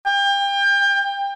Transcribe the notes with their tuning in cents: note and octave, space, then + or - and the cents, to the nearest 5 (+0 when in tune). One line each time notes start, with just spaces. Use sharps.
G5 +30